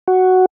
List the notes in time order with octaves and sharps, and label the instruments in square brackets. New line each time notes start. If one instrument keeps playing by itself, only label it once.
[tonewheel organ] F#4